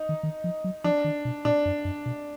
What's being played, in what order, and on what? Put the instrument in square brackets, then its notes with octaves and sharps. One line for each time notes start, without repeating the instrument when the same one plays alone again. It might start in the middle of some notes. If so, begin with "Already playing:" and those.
Already playing: [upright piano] D#4
[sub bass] D#3
D#3
F3
F#3
[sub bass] F3 [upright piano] D4
[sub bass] D#3
B2
[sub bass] A#2 [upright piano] D4
[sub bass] F#2
F#2
B2